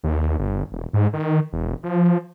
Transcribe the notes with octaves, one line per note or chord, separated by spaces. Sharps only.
D#2
G1
E1
G#2
D#3
E1
F3